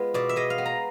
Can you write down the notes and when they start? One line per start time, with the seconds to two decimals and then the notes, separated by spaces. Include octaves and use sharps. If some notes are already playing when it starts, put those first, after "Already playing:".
Already playing: G#3 B3 F4
0.14 B2 D5
0.29 E5
0.36 G#3 D#5
0.50 F5
0.58 B3
0.66 A#5